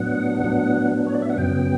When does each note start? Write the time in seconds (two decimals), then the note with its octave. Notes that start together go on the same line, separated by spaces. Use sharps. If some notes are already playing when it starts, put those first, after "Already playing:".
Already playing: A2 F#3 B3 D4 F#5
0.44 A2 F#3 B3 D4
1.07 C#5
1.15 D5
1.22 E5
1.30 F#5
1.37 F#2 C#3 F#3 B3 G5